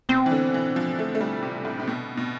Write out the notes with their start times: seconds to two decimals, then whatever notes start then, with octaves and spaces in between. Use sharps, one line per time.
0.09 B2 C4
0.26 E3
0.31 D3
0.54 E3
0.76 F3
0.99 A3
1.15 A3
1.21 G3
1.42 C3
1.65 A2
1.80 C3
1.87 B2 D4
2.17 B2